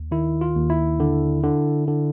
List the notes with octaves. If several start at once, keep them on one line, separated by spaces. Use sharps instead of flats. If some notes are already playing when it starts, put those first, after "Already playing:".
Already playing: D#2
D#3 E4
F4
D#2
E4
D3
D3
D3